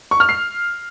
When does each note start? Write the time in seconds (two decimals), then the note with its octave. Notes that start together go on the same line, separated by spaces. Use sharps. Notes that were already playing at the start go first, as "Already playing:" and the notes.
0.11 C#6
0.20 F6
0.29 C7